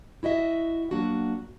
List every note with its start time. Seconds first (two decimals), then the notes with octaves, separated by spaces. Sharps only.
0.23 E4 F#4 D#5 E5
0.91 F#3 A#3 D4 F#4